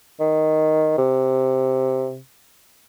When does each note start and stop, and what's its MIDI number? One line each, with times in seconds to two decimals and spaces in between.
0.20 0.98 51
0.98 2.18 48